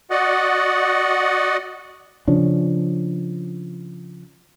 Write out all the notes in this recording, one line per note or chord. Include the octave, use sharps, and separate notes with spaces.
F#4 D5 D#5 F#5
C#3 F3 C#4 D4